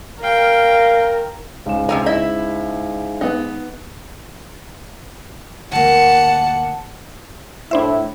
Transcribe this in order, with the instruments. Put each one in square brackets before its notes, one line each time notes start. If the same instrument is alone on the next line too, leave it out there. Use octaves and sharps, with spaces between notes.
[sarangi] A#4 [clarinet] F5 [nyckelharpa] G5
[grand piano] C#2 E7 [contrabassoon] G#2
[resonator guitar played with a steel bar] C3 C4 G#5 [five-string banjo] A#5
[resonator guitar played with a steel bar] E4 [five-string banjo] D#5
[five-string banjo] B3 D#4
[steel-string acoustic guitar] D2 A#3 [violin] F#5 [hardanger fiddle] A5
[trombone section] A2 E4 [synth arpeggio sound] D4 C5 E5